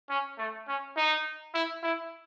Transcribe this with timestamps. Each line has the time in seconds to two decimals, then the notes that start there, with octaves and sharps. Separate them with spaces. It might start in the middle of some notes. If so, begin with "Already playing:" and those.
0.10 C#4
0.38 A3
0.68 C#4
0.97 D#4
1.54 E4
1.83 E4